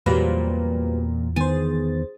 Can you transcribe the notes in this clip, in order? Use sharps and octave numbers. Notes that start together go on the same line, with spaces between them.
E2 A#2 F#3 G3 A#3 C4 B4
D#3 B3 G#4 C5 A6